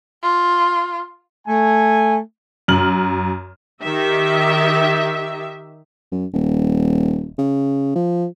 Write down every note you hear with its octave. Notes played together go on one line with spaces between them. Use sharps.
F4
A3 G#5
F#2 F6 F#7
D#3 G4 E5
F#2
D#1
C#3
F3